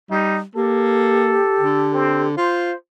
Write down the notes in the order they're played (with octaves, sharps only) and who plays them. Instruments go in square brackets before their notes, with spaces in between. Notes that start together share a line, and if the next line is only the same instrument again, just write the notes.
[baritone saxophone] G3 [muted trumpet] D#4
[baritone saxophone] A#3 [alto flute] G4 [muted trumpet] A4
[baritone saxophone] D3
[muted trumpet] C4
[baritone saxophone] F4 [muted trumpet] C5